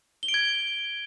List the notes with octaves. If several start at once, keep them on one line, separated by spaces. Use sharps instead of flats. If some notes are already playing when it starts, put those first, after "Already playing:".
G7
D7
G#6